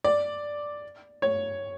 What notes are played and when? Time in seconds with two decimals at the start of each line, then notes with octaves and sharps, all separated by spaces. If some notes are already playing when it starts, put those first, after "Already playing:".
0.04 D5
1.22 C#5